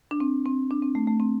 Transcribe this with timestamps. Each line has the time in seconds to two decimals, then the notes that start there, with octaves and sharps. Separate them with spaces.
0.11 D4
0.20 C4
0.46 C4
0.71 D4
0.82 C4
0.95 A3
1.08 A3
1.20 C4